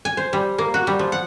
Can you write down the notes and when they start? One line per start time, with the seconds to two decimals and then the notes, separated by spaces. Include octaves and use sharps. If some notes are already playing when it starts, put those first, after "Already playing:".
0.05 G#5
0.17 C5
0.33 G3
0.58 A#3
0.74 F#4
0.87 G3
0.99 F3
1.12 F#5